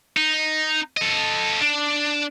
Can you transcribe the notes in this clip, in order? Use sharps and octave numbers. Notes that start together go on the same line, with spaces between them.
D#4
A4 D#5
D4